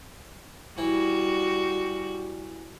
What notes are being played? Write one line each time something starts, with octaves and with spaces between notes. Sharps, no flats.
E3 G3 F#4